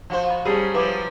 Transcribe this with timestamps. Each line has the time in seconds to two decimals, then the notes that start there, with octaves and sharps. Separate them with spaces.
0.10 F3 F#4 C5
0.30 D#5 A#5 B5
0.45 F#3 G3 C#4 G#4 A5 B5
0.74 F3 F#3 E4 B4 D6